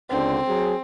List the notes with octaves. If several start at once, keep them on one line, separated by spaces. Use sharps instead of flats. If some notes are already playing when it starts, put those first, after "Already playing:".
C#2 D3 C4
F#3 G#4